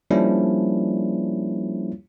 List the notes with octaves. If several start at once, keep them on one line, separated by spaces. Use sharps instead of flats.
F3 G3 A#3 C#4 D4 E4